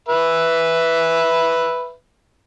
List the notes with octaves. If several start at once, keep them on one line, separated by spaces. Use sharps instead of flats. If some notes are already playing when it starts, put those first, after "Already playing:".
B4 E5